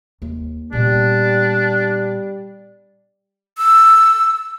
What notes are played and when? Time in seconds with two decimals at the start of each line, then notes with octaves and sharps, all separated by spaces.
0.22 D#2
0.73 A#2 G3 B3 D4
3.58 E6